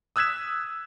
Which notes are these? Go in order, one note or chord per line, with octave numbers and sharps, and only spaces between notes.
D#6 E6 F#6 G#6 B6 E7